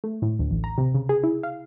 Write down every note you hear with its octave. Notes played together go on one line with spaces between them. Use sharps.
A3
A2
D2
A1
A#5
C3
C#3
G#4
E4
F5